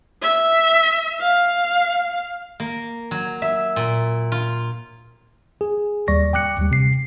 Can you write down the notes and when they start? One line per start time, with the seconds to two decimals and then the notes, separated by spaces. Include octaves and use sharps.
0.22 E5
1.20 F5
2.60 A#3
3.11 F#3
3.42 E5
3.76 A#2
4.32 F4
5.61 G#4
6.08 D#2 G3 D5 C#6 A#6
6.33 G5 D6 F#6 C#7
6.59 D#2 G3
6.71 C3 C7